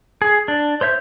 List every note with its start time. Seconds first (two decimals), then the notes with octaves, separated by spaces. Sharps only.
0.22 G#4
0.48 D4
0.81 C5 C#5 E5 G6